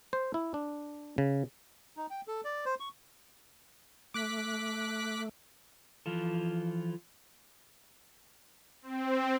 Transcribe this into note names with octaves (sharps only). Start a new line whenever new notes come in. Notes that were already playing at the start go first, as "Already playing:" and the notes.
C5
E4
D4
C#3
D#4
G5
A4
D5
C5
C#6
A3 D6 F#6 B6
E3 F3 F4 A4
C4